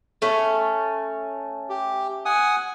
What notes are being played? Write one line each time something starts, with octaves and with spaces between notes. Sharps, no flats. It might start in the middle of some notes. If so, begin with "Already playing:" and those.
A3 C#4
G4
F#5 G#5 D#6